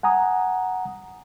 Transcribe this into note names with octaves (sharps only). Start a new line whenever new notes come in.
F#5 G#5 A#5 D#6